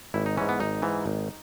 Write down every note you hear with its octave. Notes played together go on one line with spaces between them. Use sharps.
G#1 E4
D#4
G#2 E3 C#4
B3
G#1 D#4
G#2 E3
G#1